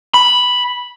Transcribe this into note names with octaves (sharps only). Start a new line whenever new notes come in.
B5